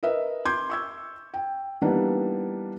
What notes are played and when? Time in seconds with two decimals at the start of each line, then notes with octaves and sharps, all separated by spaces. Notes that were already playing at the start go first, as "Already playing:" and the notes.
0.03 A#4 B4 D#5 E5
0.45 C6 D6 G6 G#6
0.70 C#6 E6 G#6
1.34 G5
1.82 E3 G3 A#3 B3 D4 D#4